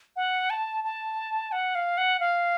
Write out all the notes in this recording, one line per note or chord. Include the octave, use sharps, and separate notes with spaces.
F#5
A5
A5
F#5
F5
F#5
F5